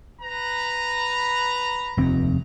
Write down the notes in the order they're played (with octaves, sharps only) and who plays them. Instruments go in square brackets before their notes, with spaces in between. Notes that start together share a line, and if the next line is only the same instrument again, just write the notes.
[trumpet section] B4 A#5
[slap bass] F1 D#2 C4